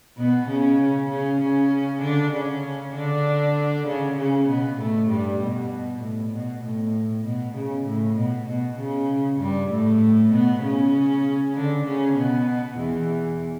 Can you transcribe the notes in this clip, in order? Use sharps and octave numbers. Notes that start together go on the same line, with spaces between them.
B2 B3
C#3 C#4
C#3 C#4
C#3 C#4
D3 D4
C#3 C#4
D3 D4
C#3 C#4
C#3 C#4
B2 B3
A2 A3
G2 G3
B2
A2
B2
A2
B2
C#3
A2
B2
B2
C#3
G2 G3
A2 A3
B2 B3
C#3 C#4
D3 D4
C#3 C#4
B2 B3
E2 E3